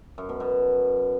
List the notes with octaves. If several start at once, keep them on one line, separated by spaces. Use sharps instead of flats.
F#2
B2
B2